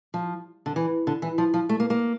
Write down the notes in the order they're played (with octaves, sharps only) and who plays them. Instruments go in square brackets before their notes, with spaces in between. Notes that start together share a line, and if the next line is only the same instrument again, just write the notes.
[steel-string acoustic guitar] F3
D3
E3
D3
E3
F3
F3
A3
A#3
A#3